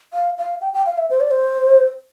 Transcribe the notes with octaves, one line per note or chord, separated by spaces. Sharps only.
F5
F5
G5
G5
F5
E5
C5
D5
C5